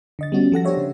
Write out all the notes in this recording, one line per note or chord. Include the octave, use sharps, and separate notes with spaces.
D3 D#5 A6
G3 B3 C#4 F#4
F3 A4 F#5 A#6
D4 G4 C5 C#5 E5
C#3